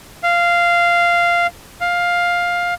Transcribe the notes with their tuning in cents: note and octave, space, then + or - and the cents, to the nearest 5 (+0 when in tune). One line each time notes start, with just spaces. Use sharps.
F5 -10
F5 +10